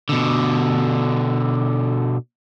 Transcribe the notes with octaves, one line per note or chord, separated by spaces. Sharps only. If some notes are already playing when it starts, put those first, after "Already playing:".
B2 D3